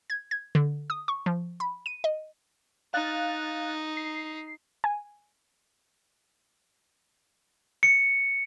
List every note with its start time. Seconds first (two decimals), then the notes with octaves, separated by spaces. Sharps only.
0.10 G#6
0.31 G#6
0.55 D3
0.90 D#6
1.08 C#6
1.26 F3
1.60 B5
1.86 D#7
2.04 D#5
2.94 D#4 F5 F#6 A6
3.97 C7
4.84 G#5
7.83 C#7